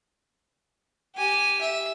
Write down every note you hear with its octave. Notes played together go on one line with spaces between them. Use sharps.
G4 G#5
E5